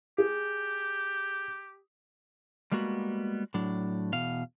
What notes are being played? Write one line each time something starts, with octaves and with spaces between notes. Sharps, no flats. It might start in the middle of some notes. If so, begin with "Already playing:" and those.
G4 G#4
G3 G#3 A#3 B3 F#4
A2 F#3 D4
E2 B2 F5